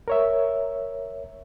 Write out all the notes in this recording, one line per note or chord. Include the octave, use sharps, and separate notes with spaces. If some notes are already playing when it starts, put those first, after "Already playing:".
A#4 C#5 E5